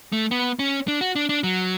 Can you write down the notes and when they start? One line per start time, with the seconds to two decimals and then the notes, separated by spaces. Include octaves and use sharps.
0.12 A3
0.31 B3
0.59 C#4
0.88 D4
1.01 F#4
1.16 D4
1.29 D4
1.43 F#3